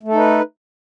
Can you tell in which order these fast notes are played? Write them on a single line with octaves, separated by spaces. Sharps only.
A3 A4 D#4 B4